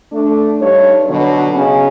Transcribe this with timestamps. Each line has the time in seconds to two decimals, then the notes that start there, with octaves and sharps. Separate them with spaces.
0.12 A3 D4
0.60 G2 G3 D#4 C#5
1.08 B2 D3 F#3
1.55 C#3 C#4 D#4